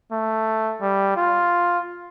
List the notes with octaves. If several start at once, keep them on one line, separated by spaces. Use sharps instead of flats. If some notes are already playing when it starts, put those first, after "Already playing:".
A3
G3
F4